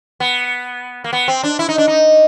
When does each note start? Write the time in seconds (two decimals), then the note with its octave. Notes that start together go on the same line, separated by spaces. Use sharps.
0.20 B3
1.04 A#3
1.13 B3
1.28 C4
1.43 D4
1.59 E4
1.69 D#4
1.78 D4
1.88 D#4